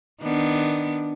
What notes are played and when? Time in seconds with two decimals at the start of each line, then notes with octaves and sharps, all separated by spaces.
0.23 D#3 B3 D4